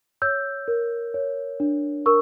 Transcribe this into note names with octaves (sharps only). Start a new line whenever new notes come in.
C#5 E6 G6
A#4
C#5
D4
A#4 C#6 E6